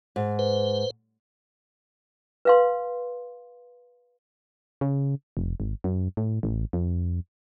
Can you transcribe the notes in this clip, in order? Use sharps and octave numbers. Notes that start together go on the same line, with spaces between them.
G#2
B4 C5
B4 F5 C6
C#3
F1
G#1
F#2
A2
A1
F2